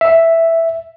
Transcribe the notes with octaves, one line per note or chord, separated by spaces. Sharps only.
E5